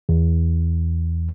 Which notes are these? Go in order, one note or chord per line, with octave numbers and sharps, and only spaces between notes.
E2